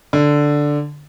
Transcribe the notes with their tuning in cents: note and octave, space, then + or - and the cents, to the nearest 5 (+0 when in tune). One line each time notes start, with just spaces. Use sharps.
D3 +0